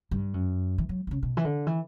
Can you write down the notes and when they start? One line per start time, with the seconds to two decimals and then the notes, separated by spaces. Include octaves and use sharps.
0.11 G2
0.34 F#2
0.78 E3
0.89 F#3
1.07 B2
1.11 C#3
1.23 B2
1.37 E3
1.45 D3
1.67 E3